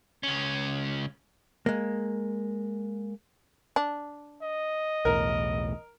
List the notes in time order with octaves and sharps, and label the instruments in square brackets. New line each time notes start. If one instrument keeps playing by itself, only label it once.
[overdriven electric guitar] C#2 C#4
[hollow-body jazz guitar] G#3 A#3
[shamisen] D4
[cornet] D#5
[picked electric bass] B1 E2 A2 [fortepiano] A#4